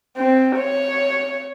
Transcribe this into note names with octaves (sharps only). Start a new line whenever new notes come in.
C4
C#5